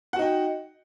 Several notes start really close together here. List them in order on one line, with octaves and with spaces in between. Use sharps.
F#5 F#4 D#4 G5